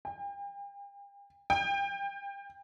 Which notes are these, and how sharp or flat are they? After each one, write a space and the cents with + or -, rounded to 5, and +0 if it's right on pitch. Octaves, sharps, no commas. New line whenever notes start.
G5 +40
G5 +30